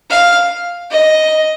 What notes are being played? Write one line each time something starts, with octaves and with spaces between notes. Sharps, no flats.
F5
D#5